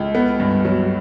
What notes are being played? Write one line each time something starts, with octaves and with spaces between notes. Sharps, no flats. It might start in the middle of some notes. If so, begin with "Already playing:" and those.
Already playing: C#2
B3
G2
F#3